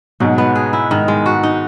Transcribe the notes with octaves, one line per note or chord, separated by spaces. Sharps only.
G#2 B2 F#3
B3
G#4
E4
G#2 D#3
G#3
F#4
D#4